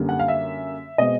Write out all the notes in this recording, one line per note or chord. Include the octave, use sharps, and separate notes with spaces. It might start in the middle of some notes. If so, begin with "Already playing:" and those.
Already playing: F#2 D3 G3 A#3
F#5
F5
E5
B2 G#3 C4 D#5